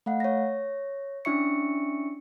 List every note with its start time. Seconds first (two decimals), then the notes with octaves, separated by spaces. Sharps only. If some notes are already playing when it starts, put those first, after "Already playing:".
0.06 A3 F5 F#5
0.20 C#5 A#6
1.25 C#4 D4 E4 E5 C#6 C#7